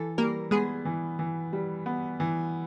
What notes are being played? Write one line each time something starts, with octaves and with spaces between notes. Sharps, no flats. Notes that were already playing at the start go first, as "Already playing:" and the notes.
Already playing: E3 A4
G3 A#3 A#4
G#3 B3 G#4
E3
E3
G3
B3
E3